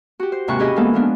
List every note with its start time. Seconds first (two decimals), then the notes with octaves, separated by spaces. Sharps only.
0.19 F#4 G4
0.32 C5
0.48 D#2 G#2 C3 E4 C#6 F#6
0.59 C#4 E4 G4 G#4 D#5 B5
0.76 E3 G#3 A#3 B3 E4 A4
0.93 F3 G#3 B3 D4